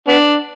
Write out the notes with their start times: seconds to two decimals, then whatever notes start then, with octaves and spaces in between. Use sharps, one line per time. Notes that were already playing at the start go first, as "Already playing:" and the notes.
0.08 B3 D4